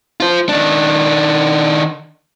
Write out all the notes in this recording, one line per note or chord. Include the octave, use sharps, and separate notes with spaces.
F4 C5
D#3 D4